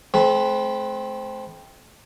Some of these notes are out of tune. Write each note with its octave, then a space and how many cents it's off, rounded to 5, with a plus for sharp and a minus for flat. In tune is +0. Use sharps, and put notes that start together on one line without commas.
A3 -40 C4 +0 B4 +0